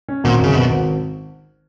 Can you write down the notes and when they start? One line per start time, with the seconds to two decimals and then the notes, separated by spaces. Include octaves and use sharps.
0.08 C#4
0.24 G#1 A#2
0.40 F#2 C#3
0.55 G#1 B2
0.70 G#1